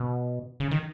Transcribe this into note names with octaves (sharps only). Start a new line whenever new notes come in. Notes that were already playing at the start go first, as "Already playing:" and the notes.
Already playing: B2
C#3
D#3